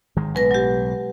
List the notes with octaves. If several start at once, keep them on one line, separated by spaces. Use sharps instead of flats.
G#1 D#3 G#3
B1 A2 G#3 B4 A#6
F#3 G4